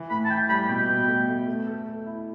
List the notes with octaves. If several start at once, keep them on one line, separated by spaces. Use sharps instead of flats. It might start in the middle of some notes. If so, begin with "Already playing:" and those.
Already playing: E3
A2 B5
A5
E3 G5
G3 B5
B2 G5
B2
A3
A3
A3
A4
A4
E4